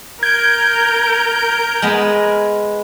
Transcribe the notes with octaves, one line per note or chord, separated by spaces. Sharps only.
A#4 G6 G#6 D7
G#3 B3